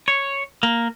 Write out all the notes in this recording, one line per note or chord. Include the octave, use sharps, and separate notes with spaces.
C#5
A#3